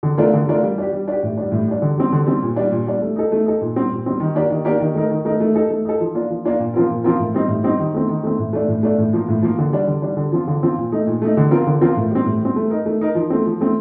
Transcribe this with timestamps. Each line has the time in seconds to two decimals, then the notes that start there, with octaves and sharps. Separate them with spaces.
0.03 D3
0.18 A3 D4 F4 A#4
0.33 D3
0.48 A3 D4 F4 A#4
0.63 G3
0.78 D4 G4
0.92 G3
1.08 D4 G4
1.23 A2
1.37 G3 D4
1.52 A2
1.68 G3 D4
1.82 D3
1.98 G3 C4
2.12 D3
2.26 G3 C4
2.42 A#2
2.56 G3 D4
2.71 A#2
2.87 G3 D4
3.01 A3
3.16 D#4 A4
3.32 A3
3.46 D#4 A4
3.61 A#2
3.76 G3 C4
3.91 A#2
4.06 G3 C4
4.20 D#3
4.35 A#3 D4 G4 A#4
4.50 D#3
4.65 A#3 D4 G4 A#4
4.80 D#3
4.95 A3 D#4 A#4
5.10 D#3
5.25 A3 D#4 A#4
5.40 A3
5.55 D#4 A4
5.70 A3
5.85 D#4 A4
6.00 F3
6.15 A#3 D4 F4
6.30 F3
6.45 A#3 D4 F4
6.60 A#2
6.74 F3 C4 F4 A#4
6.89 A#2
7.04 F3 C4 F4 A#4
7.19 A2
7.34 G3 C4 D#4
7.48 A2
7.63 G3 C4 D#4
7.79 D#3
7.94 A3 C4
8.09 D#3
8.23 A3 C4
8.38 A2
8.53 A3 D4
8.68 A2
8.83 A3 D4
8.98 A2
9.13 F3 A#3
9.28 A2
9.42 F3 A#3
9.58 D3
9.73 G3 D4
9.87 D3
10.02 G3 D4
10.17 D3
10.32 F3 C4 F4
10.47 D3
10.62 F3 C4 F4
10.77 A#2
10.92 A3 D#4
11.07 A#2
11.22 A3 D#4
11.37 D3
11.51 F3 C4 F4 A#4
11.67 D3
11.81 F3 C4 F4 A#4
11.96 A2
12.11 G3 C4
12.26 A2
12.41 G3 C4
12.56 A3
12.70 D#4 A#4
12.86 A3
13.01 D#4 A#4
13.15 F3
13.30 A3 C4
13.45 F3
13.61 A3 C4